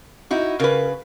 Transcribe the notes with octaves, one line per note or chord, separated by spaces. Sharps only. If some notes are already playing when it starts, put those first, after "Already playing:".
D#4 E4 F#4
C#3 A#4 B4